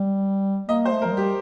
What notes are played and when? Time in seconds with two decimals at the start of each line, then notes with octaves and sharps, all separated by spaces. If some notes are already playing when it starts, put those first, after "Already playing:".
Already playing: G3
0.69 A#3 D#5
0.85 C5
0.91 A3
1.02 A#4
1.05 F3
1.12 G3
1.17 G4